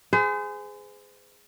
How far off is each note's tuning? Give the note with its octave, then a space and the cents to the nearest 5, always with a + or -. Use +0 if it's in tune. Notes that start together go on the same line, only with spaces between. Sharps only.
G#4 +0 C5 -40